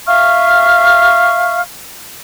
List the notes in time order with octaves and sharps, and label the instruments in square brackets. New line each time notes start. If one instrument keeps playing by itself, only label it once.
[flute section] E5 F5 C#6 F6